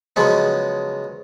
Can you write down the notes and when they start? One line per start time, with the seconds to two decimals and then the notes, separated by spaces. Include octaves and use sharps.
0.16 C#3 F3 F#3 G#3 B3